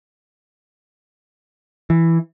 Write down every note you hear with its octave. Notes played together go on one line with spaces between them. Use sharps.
E3